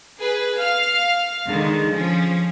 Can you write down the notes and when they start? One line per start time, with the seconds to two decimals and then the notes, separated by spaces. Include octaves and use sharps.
0.20 G#4 B4
0.57 F5 F6
1.47 D3 D#3 G#3
1.90 F3 C#4